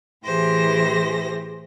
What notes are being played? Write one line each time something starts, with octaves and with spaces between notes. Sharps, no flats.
A2 E3 G4 G#4 C5 A#6